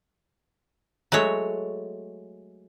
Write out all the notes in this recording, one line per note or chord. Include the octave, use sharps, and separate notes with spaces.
F#3 G#3 A3 C#5